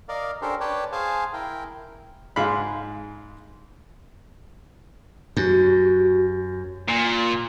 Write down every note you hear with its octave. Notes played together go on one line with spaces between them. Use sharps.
A#4 D5 D#5 F5
C#4 D4 G4 A4 A#4 C5
B4 C#5 D5 G5 A5
G#4 C5 F5 G#5 A5
E4 A#4 G5
G#2 G#3 F5 B5
F#2 F#4 G4
A#2